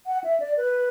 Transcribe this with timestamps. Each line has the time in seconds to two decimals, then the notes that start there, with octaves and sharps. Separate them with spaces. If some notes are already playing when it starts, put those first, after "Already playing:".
0.06 F#5
0.24 E5
0.40 D5
0.57 B4